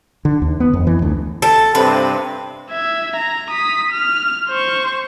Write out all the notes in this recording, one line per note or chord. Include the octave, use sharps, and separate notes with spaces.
D3
D#2
B3
F2
E3
D2
A4
G2 C3 C4 B4
E5 G#6
A#5
D#6 B6
F6
C5 C#6